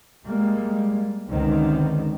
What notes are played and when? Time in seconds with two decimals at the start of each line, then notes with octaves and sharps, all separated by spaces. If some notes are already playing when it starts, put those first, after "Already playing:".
0.25 G3 G#3 A#3
1.28 C#2 F#2 D3 D#3 C4